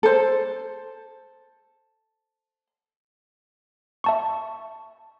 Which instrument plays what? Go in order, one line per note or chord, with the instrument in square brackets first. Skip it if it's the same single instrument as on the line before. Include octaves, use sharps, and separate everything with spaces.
[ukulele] A4 C5
[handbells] E5 A5 C#6